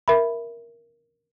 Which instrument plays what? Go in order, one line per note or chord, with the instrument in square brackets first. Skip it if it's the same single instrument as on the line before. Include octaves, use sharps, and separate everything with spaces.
[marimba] A#4 E5 B5